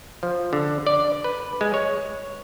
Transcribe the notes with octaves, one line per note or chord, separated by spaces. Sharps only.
F3
D3
D5
B4
G#3
C#5